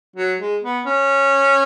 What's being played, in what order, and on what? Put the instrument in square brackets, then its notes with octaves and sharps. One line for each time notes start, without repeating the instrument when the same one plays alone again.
[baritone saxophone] F#3
G#3
B3
C#4